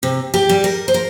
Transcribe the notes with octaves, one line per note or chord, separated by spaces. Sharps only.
C3
G4
G3
A#4
C5
A#4